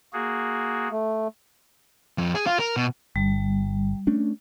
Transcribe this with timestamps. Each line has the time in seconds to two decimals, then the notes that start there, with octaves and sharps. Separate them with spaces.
0.13 A#3 F#4 G#4
0.92 A3
2.18 F2
2.35 G#4
2.47 F4
2.59 A#4
2.77 B2
3.16 G1 G3
4.07 A3 C#4 D4